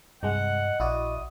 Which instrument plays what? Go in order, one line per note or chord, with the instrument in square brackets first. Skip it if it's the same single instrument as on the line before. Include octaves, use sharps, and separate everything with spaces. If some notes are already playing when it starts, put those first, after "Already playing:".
[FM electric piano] C2 G#3 [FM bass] G2 [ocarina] D#5 [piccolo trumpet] F#5
[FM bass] A#1 [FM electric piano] E4 F#4 D5 [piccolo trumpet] D#6